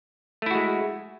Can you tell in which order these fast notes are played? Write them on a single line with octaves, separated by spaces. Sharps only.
A3 E4 F#4 G#3